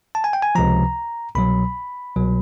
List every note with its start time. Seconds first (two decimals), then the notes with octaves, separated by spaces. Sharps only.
0.15 A5
0.24 G#5
0.33 G5
0.42 G#5
0.55 C#2 C3 F3 A#5
1.35 C2 B2 F#3 B5
2.15 C2 B2 F#3